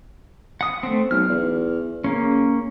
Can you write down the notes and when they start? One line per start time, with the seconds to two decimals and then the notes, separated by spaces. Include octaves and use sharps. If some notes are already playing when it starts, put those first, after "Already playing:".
0.61 F#5 D#6
0.83 A3 C4
1.11 B1 F6
1.29 E2
2.04 C#3 A#3 C#4